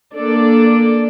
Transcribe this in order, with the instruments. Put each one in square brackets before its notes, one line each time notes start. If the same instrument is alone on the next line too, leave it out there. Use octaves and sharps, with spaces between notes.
[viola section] A#3 D4 A4 D5